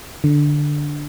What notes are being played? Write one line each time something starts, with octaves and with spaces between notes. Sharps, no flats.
D3